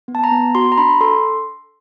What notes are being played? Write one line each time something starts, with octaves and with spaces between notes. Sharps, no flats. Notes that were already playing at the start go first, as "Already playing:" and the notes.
B3
A5
A#5
B3
F#4 C6
A#5
D4 B5
A4 C6